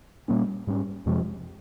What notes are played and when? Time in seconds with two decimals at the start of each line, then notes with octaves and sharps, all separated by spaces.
0.28 A#2 G3 A#3 C#4
0.67 G#2 G3 C#4
1.06 F2 C3 F3 G#3